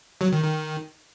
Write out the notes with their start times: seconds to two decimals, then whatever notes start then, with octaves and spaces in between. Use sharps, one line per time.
0.21 F#3
0.32 D#3
0.44 D#3